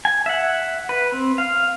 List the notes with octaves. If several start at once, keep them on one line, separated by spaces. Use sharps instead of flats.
G#5
E5 F#5
B4
C4
F5